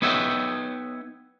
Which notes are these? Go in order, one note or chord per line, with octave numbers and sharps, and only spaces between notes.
B3 D#4 C#5 E5 F#5 G5